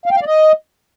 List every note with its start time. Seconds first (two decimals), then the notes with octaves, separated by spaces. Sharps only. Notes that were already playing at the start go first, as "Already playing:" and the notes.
0.06 F5
0.11 G5
0.16 F5
0.21 D5
0.27 D#5